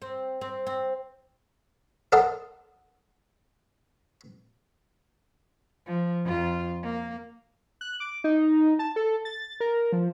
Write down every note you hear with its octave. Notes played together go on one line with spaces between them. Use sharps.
C4
C4
C4
A4 A#4 D#5 F#5 A#5 C6
F3
F2 F4
A#3
F#6
D6
D#4
A5
A4
A6
A#4
F3